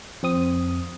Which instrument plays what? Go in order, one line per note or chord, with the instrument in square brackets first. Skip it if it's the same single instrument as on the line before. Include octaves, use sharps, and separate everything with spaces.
[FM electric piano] F2 C4 D#6